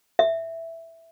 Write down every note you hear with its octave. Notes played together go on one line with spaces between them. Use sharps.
E5